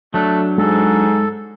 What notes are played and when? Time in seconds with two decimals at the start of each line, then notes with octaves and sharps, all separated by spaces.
0.14 F#3 A3 D4
0.58 G#2 G#3 A4